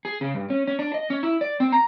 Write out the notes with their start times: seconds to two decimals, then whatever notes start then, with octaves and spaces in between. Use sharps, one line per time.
0.05 G#4
0.21 C#3
0.35 G2
0.50 C#4
0.67 C#4
0.79 D4
0.94 D#5
1.10 C#4
1.23 E4
1.41 D5
1.60 C4
1.72 A#5